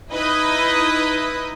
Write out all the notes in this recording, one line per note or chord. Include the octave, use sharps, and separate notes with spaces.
D#4 E4 B4 D#5